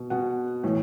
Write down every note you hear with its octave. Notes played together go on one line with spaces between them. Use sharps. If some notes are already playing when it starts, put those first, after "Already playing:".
Already playing: B2
B2 F#5
A2 E3